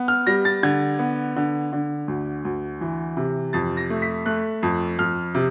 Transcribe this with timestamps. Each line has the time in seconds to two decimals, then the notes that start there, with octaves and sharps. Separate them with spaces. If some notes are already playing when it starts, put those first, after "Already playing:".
Already playing: B3
0.08 F6
0.27 G3 A#6
0.45 A6
0.63 D3 G#6
0.99 B3
1.36 D3
1.73 D3
2.08 D2
2.45 D2
2.81 E3
3.17 C3
3.53 F2 A6
3.77 A#6
3.90 A3
4.02 B6
4.26 A3 F#6
4.63 F2
4.99 F2 F6
5.35 C3